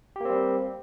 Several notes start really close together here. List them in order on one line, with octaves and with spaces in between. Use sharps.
G4 A#3 C4 G3